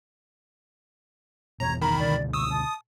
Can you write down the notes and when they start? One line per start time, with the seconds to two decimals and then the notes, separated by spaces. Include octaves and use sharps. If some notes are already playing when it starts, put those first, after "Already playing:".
1.60 G1 E2 B2 C#5 A#5
1.82 D#3 A#5 B5
1.99 C#2 B2 D3 D5
2.33 C#6 D#6 E6
2.50 A5 D#6